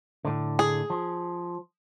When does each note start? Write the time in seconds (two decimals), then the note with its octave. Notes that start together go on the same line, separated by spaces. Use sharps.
0.25 A2 D3
0.59 G#4
0.90 F3